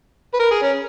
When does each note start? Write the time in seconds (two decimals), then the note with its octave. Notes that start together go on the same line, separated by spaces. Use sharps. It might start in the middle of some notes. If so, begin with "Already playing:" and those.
0.34 B4
0.40 A#4
0.51 G#4
0.62 C#4